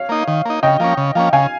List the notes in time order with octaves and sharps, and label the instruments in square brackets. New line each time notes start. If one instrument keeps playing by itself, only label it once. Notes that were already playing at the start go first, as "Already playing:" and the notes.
Already playing: [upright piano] C#5 F5
[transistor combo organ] A#3 D#4
D#3
A#3 D#4
[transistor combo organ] C#3 [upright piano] D#5 G5
[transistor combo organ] F3 A#3 C#4
C#3
F3 A#3 C#4
[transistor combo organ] C#3 [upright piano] F5 G#5